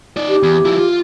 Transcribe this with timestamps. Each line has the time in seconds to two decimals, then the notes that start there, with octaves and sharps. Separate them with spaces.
0.17 D#4 D5
0.29 G4
0.43 E2
0.65 F3 E4
0.79 F4